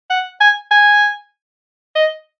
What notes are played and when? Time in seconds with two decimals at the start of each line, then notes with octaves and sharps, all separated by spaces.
0.10 F#5
0.41 G#5
0.71 G#5
1.96 D#5